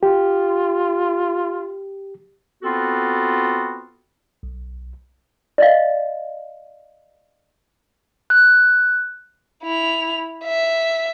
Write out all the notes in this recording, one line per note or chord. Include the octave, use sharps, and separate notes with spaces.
F4 G4
B3 C4 F4 F#4 A4
B1
D5 D#5 F5
F#6
E4 F7
E5